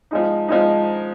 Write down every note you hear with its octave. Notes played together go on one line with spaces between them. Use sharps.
F3 G#3 D#4
F3 G#3 D#4